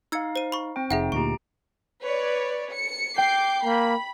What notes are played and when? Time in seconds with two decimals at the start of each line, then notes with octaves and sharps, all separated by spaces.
0.12 D#4 F5 E6 G#6 C#7
0.36 C5 D#7
0.52 B5 C#6
0.76 C4 G5
0.91 F1 D#4 G#4 E5 F#5
1.12 D2 A#2 G4 A#5 C#6 D7
2.03 B4 C#5 D5
2.73 C#7
3.18 G5 D6 G6 C7
3.65 A#3 B5